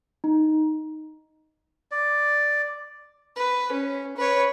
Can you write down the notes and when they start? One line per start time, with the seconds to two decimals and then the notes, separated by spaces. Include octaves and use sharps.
0.24 D#4
1.91 D5
3.36 B4
3.72 C#4
4.17 B4 C#5